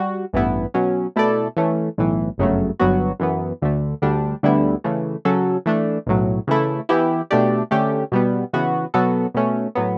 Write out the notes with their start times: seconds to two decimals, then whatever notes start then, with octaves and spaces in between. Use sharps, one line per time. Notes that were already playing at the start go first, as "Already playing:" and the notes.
Already playing: G3 F#4
0.33 A1 G2 E3 B3 E4
0.74 B2 F#3 C#4
1.16 B2 A3 E4 A4 D5
1.57 E3 A3 C#4
1.98 B1 A2 E3
2.38 G1 F#2 C#3 F#3 A3
2.80 G1 G2 F#3 B3 F#4
3.20 F#2 E3 B3
3.62 D2 D3 A3
4.02 D2 D3 G3 D4
4.43 D2 D3 G3 B3 E4
4.84 C#3 E3 A3
5.25 C#3 F#3 C#4 F#4 A4
5.66 E3 A3 D4
6.06 B1 A2 F#3
6.47 C#3 E3 A3 E4
6.89 E3 B3 E4 G4
7.31 B2 A3 D4 G4 D5
7.71 D3 A3 C#4 G4
8.12 B2 G3 B3
8.53 C#3 E3 B3 F#4
8.94 B2 F#3 B3 F#4 A4
9.34 B2 A3 C#4
9.75 A2 F#3 B3